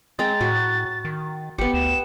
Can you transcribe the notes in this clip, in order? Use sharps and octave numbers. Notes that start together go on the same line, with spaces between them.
G#3 C4 G5 A#5 A6
A2 F#4
D#3
G#1 B3 G4 C#7
D2 E7